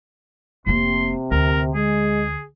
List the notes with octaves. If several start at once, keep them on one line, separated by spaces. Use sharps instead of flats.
F1 C3 A#3 C6
D2 A#4
G#3 G#4